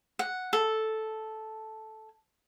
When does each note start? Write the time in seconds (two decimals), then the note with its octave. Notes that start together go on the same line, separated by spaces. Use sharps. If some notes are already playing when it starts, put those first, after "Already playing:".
0.19 F#5
0.53 A4